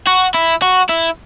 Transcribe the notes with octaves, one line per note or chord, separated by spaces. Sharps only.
F#4
E4
F#4
E4